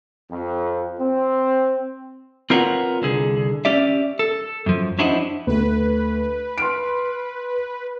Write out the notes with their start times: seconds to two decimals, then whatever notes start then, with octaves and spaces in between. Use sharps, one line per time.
0.30 F2
0.99 C4
2.50 C4 F4 A#4 B4 C#5 F#5
3.02 C2 D3 G#4
3.65 C#4 G4 D5 E5
4.19 A4
4.66 F#2 F3
4.99 C#4 D4 E4 F#4 C5 D#5
5.47 D2 B4
6.58 C6 F6 D7